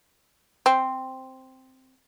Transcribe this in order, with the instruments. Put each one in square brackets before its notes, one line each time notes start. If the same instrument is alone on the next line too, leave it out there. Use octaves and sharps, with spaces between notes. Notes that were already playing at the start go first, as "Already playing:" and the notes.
[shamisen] C4